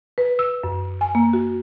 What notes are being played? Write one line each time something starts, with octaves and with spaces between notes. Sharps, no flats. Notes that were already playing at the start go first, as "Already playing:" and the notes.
B4
E6
F#2
G#5
A#3
F#4